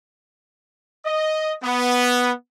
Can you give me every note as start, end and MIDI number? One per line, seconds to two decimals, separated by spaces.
1.06 1.53 75
1.63 2.32 59